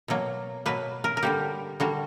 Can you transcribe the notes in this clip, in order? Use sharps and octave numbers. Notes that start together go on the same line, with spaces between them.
B2 F#3 A#3
B2 F#3 A#3 B4
A#4
A#4
D3 G3 A#3 G4
D3 G3 A#3 F#4